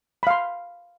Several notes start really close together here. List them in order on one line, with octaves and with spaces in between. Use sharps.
B5 F5 C6